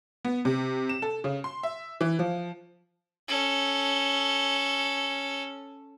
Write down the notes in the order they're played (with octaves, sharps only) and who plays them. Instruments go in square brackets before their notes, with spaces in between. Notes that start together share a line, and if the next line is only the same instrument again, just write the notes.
[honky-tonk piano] B3
C3
E7
A4
C#3
C6
E5
E3
F3
[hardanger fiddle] C#4 A4